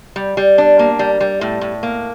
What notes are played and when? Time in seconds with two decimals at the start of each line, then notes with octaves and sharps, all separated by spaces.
0.16 G3
0.37 G3
0.58 D4
0.79 A#3
0.99 G3
1.20 G3
1.41 A2
1.61 A2
1.83 A#3